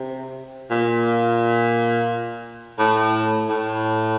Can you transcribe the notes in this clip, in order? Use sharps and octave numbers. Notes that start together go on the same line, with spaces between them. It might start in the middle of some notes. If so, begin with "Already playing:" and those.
Already playing: C3
A#2
A2
A2